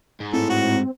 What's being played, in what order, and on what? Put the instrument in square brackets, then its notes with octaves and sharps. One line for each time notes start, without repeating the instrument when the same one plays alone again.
[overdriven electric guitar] G#2
[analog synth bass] A2 [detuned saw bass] C4 [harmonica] A4
[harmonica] F#4